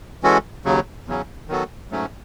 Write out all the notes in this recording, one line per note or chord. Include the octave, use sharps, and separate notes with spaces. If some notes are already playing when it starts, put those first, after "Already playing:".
E3 G#3 C#4 F#4 A4
D#2 C#3 F#3
E2 C#3 F#3 C#4
D#3 F#3 B3 F#4 A4
G#2 F#3 A3 C#4